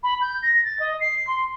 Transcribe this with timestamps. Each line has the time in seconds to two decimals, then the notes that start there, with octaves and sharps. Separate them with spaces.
0.03 B5
0.21 G6
0.42 A#6
0.64 A6
0.79 D#5
1.00 C7
1.27 C6